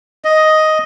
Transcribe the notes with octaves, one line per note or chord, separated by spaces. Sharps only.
D#5